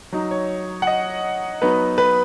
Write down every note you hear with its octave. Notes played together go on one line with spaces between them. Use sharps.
F#3 D#4
C#5
F#5
D#5
F#3 B3 D#4 B4
B4